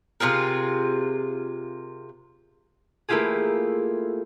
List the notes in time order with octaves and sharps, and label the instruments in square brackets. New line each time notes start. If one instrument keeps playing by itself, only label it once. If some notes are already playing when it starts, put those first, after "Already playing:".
[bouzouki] C3 F4 G#4 A#4
[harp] A3 A#3 E4 F4 G4 G#4